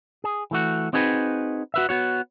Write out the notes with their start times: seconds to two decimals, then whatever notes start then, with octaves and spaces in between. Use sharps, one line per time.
0.24 G#4
0.51 E3 A3 F#4
0.93 C4 D#4 F#4 G#4 A#4 B4
1.74 F#4 B4 E5
1.89 B3 F#4 C#5